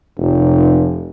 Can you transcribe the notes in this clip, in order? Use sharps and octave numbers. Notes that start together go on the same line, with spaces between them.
F1